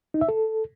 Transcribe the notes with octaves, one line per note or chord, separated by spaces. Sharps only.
D#4
E5
A4